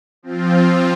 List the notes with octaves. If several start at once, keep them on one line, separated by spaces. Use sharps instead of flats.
F3 C4 F4